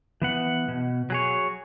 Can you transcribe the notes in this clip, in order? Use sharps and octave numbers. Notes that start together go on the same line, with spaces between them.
E3 B3 F#5
B2
F#3 G#4 C#5